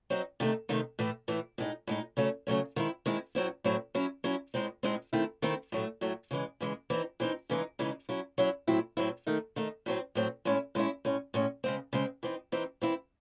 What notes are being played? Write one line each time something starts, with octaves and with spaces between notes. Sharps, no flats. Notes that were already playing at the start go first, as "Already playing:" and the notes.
F#3 C4 D#4
C3 D#3 A3 D#4
C3 D#3 A3 D#4
A2 E3 A3
A2 E3 A3
A2 G#3 D#4
A2 G#3 D#4
C#3 F#3 A3 C#4
C#3 F#3 A3 C#4
D#3 G#3 C4 E4
D#3 G#3 C4 E4
A2 F#3 C4 E4
A2 F#3 C4 E4
F#3 C#4 E4
F#3 C#4 E4
A2 G#3 C4 D#4
A2 G#3 C4 D#4
D#3 A3 C4 E4
D#3 A3 C4 E4
A2 F#3 A3
A2 F#3 A3
C#3 E3 G#3
C#3 E3 G#3
E3 C4 D#4
E3 C4 D#4
C#3 E3 G#3 D#4
C#3 E3 G#3 D#4
F#3 C#4 E4
F#3 C#4 E4
A2 F#3 C4 E4
A2 F#3 C4 E4
D#3 A3 D#4
D#3 A3 D#4
A2 F#3 C4
A2 F#3 C4
A2 G#3 C#4 E4
A2 G#3 C#4 E4
A2 G#3 C#4
A2 G#3 C#4
C#3 G#3 C4
C#3 G#3 C4
E3 C4 D#4
E3 C4 D#4
E3 C4 E4